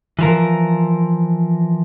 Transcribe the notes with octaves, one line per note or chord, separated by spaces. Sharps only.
E3 F3 A#4